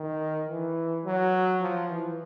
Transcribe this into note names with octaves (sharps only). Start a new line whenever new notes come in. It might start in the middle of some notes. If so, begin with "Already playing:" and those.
Already playing: D#3
E3
F#3
F3
E3